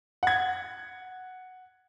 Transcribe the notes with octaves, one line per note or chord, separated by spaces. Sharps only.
F#5 G#6